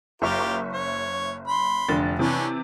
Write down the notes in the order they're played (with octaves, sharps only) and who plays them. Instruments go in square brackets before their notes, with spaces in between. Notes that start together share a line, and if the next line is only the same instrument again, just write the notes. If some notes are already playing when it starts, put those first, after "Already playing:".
[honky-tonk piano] F#1 E5 C#6 [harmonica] F4 G4 A#4
[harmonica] C#5
B5 C6
[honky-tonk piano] F1 D3 A6
[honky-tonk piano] C3 E3 [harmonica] B3 C#4 D4